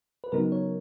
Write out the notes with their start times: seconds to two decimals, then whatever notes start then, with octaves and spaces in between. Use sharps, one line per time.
0.24 B4
0.32 C#3 F#3 B3 D#4 A#4
0.52 C#5